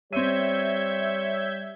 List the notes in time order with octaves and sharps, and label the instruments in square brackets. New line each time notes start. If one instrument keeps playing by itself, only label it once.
[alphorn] G3 [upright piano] C4 D#7 [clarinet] C#5 [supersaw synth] E5 G6 G#6